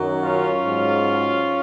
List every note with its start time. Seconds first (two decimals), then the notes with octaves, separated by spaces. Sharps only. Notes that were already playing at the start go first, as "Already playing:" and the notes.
Already playing: F#2 D#3 F#3
0.22 C#4 F4
0.63 G#2 F#3